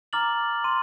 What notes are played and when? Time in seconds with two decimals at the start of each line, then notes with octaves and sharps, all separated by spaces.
0.13 A#5 D6 F6 A6 F#7
0.64 C6 D#7